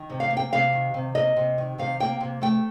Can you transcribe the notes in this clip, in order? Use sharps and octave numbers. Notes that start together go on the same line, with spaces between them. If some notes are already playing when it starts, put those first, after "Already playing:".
Already playing: D#3
C3
F5
A#3
G5
C3 F5
D#3
C3
A#3 D#5
C3
D#3
C3 F5
A#3 G5
C3
A3 G5